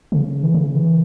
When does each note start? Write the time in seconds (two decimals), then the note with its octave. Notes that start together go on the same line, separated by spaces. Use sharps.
0.12 C#3
0.43 E3
0.54 C3
0.59 C#3
0.75 E3